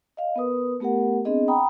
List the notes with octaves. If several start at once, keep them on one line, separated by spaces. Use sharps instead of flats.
D#5 F5
B3 A#4 B4 D#6
A3 B3 G4 A#4 F#5
B3 C4 D4 G#4 D#5
F#5 G5 A#5 B5 D#6